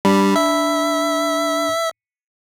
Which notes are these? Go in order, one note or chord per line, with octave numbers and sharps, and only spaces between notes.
G3 D4 B5
E5